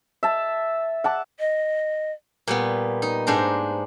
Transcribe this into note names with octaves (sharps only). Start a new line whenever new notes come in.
E5 A5
F#5 A5 D6
D#5
A#2 G3 B3
D#4
G#2 D4 C5 A#5